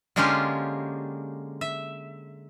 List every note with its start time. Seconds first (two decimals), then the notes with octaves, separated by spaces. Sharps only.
0.16 D3 G#3 A#3 C#4 F4 G4
1.61 E5